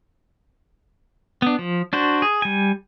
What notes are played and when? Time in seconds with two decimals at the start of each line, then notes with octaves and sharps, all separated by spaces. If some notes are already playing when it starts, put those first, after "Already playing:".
1.42 B3 D4
1.59 F3
1.93 D4 F#4 C5
2.22 G#4
2.42 G3 G#5